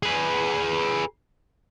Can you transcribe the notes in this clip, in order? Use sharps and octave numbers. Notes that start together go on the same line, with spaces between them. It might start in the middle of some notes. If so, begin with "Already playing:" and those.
G#4 B4